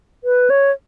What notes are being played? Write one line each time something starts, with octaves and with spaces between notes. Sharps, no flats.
B4
C#5